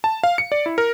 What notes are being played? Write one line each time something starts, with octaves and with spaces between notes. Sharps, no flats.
A5
F5
C#7
D5
E4
A#4